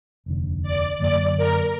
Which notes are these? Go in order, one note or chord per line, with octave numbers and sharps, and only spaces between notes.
F1 D#2 D3
D5
F#2 D3 F#3 A#3 D5
A#4